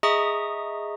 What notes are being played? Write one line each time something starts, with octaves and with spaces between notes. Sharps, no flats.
G#4 D#5 E5 A#5 C#6 D#6